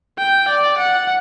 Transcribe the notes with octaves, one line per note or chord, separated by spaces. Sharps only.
G5
D5
F#5